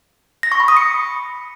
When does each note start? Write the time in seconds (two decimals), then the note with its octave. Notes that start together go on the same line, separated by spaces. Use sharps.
0.43 A#6
0.52 C#6
0.60 B5
0.68 D#6
0.77 C#7